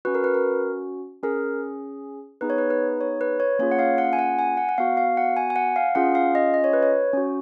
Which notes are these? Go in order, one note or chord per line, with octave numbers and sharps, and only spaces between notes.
C#4 F#4 B4
A#4
B4
A#4
C#4 G#4 A#4
B3 D#4 G#4 B4
C#5
B4
B4
C#5
B4
C#5
A#3 C#4 F4 G#4 C#5
F#5
F5
F#5
G#5
F#5
G#5
F#5
F#5
B3 F#4 F5
F5
F#5
G#5
G#5
F#5
F5
C#4 F4 G#4 F#5
F5
D#5
D#5
C#5
B4
C#5
C#4 F#4